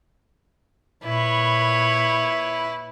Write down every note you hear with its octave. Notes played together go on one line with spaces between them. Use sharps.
A#2 E4 B4 C#5